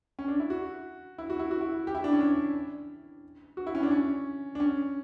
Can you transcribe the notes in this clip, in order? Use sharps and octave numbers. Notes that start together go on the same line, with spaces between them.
C#4
D4
E4
F#4
E4
F#4
E4
F#4
E4
G4
E4
D4
C#4
D4
F#4
E4
C#4
D4
C#4
D4
C#4